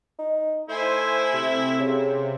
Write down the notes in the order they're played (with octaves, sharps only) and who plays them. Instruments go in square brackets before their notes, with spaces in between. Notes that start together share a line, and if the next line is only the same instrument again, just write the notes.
[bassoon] D#4
[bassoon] A3 [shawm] E4 [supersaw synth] C5 G#5
[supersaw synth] C3
[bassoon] C#3